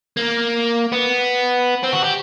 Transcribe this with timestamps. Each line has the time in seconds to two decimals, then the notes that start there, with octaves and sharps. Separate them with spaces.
0.17 A#3
0.92 B3
1.83 C4
1.92 F#4
2.03 G4